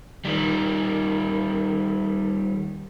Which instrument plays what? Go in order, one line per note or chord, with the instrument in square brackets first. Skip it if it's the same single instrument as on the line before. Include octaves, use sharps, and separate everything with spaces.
[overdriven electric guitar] D#3 G3